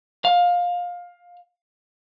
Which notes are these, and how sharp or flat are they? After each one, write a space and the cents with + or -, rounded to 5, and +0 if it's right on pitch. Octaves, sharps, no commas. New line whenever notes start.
F5 +20